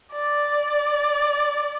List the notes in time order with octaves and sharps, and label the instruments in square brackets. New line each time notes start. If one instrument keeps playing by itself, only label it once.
[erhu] D5